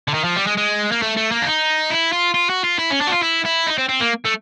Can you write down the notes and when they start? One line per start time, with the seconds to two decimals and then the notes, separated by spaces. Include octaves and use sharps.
0.08 D3
0.14 D#3
0.24 F3
0.36 G3
0.47 G#3
0.57 G#3
0.91 A#3
1.02 A3
1.17 A3
1.32 A#3
1.42 D4
1.47 D#4
1.90 E4
2.12 F4
2.34 F4
2.50 F#4
2.64 F4
2.79 E4
2.91 C#4
3.01 D4
3.08 F#4
3.12 F4
3.23 E4
3.45 E4
3.67 D#4
3.78 C4
3.89 C4
4.01 A#3
4.25 A3